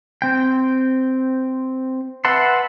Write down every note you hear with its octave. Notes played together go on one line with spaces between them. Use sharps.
C4 G5
B4 E5 F#5 A5 C6